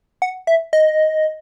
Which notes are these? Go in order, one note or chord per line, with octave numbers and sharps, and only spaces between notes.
F#5
E5
D#5